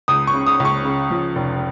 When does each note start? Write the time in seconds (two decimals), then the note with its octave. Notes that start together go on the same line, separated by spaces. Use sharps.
0.08 C#2 D#6
0.27 C#6
0.34 C#3
0.47 D#6
0.60 C#2
0.65 C#6
0.85 C#3
1.11 F3
1.35 F1